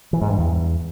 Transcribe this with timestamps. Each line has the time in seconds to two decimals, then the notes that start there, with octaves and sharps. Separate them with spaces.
0.13 E3
0.21 G#2
0.30 G2
0.38 E2